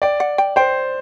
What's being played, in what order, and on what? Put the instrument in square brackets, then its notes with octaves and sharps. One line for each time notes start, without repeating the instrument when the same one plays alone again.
[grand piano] D5 [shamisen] G5
[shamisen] F#5
G5
[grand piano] C5 [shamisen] G5